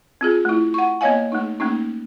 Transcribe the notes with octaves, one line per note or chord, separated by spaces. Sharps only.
C4 F4 G#4
A3 E4
F#5 C#6
A#3 B3 C#5 D#5 F5 G#5
A3 D#4
A3 A#3 C#4 D#4